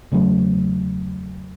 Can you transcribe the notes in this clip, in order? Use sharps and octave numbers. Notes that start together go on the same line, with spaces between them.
E2 C#3 F#3 A3